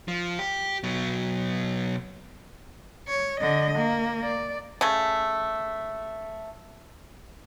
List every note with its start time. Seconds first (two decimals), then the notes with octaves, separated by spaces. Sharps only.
0.08 F3
0.39 G4
0.83 B2 F#3
3.08 C#5
3.40 D3 D#5
3.78 A#3
4.22 D5
4.81 C#3 A3